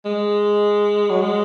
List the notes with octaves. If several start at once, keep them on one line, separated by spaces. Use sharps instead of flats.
G#3
F#3
G#3